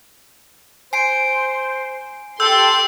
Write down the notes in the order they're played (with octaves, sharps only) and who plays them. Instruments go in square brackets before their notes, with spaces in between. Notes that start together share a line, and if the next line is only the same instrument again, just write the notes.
[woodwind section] C5 [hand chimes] G#5 C7 D7
[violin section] G4 G5 C6 [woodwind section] A4 [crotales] E6 G6